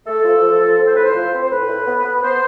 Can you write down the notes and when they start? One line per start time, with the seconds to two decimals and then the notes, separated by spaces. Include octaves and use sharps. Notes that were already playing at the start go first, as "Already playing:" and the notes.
0.06 A3 A4
0.24 F3
0.42 F3
0.60 F3
0.78 C4
0.87 C5
0.96 A2 B4
1.04 C5
1.14 F3
1.32 C4
1.40 C5
1.50 A2 B4
1.68 A2
1.86 B3
2.04 B3
2.22 B3 C5